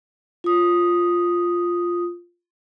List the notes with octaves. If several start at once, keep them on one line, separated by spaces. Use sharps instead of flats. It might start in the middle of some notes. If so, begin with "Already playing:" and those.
F4 D#6